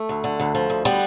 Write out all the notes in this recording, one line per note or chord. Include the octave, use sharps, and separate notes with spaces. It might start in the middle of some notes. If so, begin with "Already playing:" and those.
Already playing: A3
D2
D3
D2
F3
D2
D3 G3 B3